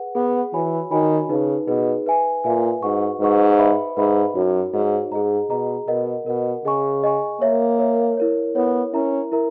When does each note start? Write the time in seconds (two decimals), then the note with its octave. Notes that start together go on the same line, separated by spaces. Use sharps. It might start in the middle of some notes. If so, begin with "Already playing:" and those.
Already playing: G#4 B4 F#5
0.15 B3 G#4 B4 F#5
0.53 E3 F#4 C#5 G#5 B5
0.91 D#3 F#4 C#5 G#5 B5
1.29 C#3 D#4 G#4 B4
1.67 B2 D#4 G#4 B4
2.06 B4 E5 G#5
2.44 A#2 B4 E5 G#5
2.82 G#2 F#4 B4 F#5 C#6
3.20 G#2 F#4 B4 F#5 C#6
3.59 B4 E5 B5
3.97 G#2 B4 E5 B5
4.35 F#2 D#4 F#4 C#5
4.74 G#2 D#4 F#4 C#5
5.12 G#2 G#4 D#5 A#5
5.50 B2 G#4 D#5 A#5
5.88 B2 A#4 D#5 F#5
6.26 B2 A#4 D#5 F#5
6.64 C#3 G#4 D#5 G#5 C#6
7.03 G#4 D#5 G#5 C#6
7.41 A#3 A#4 C#5 E5
7.79 A#4 C#5 E5
8.17 E4 A#4 C#5
8.55 B3 E4 A#4 C#5
8.93 C#4 E4 A#4 E5 A#5
9.32 E4 A#4 E5 A#5